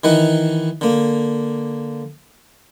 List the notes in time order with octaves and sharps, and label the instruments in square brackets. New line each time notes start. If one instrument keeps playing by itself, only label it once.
[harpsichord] D#3 E3 D#4 F#5
D3 A#3